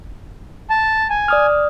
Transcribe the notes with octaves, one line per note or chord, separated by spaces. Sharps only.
A5
G#5
D5 D#6 F6